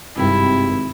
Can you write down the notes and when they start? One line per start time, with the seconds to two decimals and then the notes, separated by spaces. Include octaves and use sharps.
0.16 G#1 G2 C3 D#3 E4